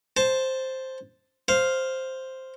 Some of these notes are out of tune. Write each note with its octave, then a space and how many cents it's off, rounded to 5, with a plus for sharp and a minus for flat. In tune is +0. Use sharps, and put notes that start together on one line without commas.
C5 +0 A5 +0
C5 +0 F5 +0